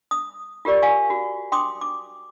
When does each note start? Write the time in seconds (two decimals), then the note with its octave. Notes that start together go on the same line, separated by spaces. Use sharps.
0.11 D#6
0.65 F4 G4 A#4 D5 C#6
0.82 F5 G#5 C#6
1.10 F#4
1.52 G5 C6 D6 D#6
1.81 D6